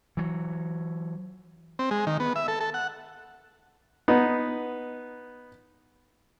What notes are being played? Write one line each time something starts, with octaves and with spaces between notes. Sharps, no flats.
E3 F#3
C4
G#3
D#3
B3
E5
A4
A4
F#5
B3 D#4